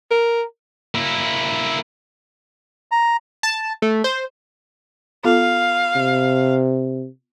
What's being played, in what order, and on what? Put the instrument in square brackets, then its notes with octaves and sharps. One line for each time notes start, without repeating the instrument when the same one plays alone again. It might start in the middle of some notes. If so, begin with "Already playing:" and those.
[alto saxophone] A#4
[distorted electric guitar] A#3 E4
[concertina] A#5
[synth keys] A5
A3
C5
[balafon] B3 F4 A4 [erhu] F5
[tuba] C3